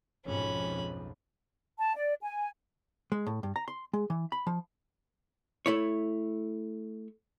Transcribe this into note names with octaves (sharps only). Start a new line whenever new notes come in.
B1 F2 G#2 C#4 B5
A5
D5
G#5
G#3
A2
G2
A#5
C6
G#3
E3
B5
F3
A3 E4 C#5